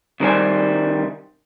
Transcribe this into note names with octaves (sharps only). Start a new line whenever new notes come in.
C2 D#3 G3 A4 C5 G#5